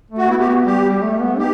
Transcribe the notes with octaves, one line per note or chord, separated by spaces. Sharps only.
A3
F#4
B3 E4
G4
F#4
G3 G4
G3
A3
B3
D#4 G4